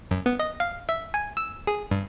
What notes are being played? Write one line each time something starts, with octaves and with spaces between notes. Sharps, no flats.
F#2
B3
D#5
F5
E5
G#5
E6
G#4
G2